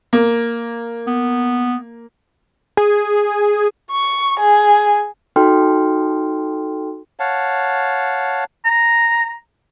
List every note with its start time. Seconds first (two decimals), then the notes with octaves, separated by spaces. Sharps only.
0.13 A#3
1.07 B3
2.77 G#4
3.92 C#6
4.40 G#4
5.36 D#4 F#4 A4 G5 C6 F6
7.20 C#5 F5 F#5 A5
8.65 A#5